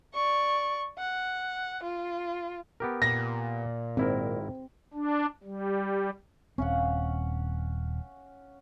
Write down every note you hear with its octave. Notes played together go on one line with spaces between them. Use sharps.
D5 C#6
F#5
F4
B3 G4 A#4
A#2 A#6
G#1 C4 E4 A#4
D4
G3
D#1 C4 C#4 F5 F#5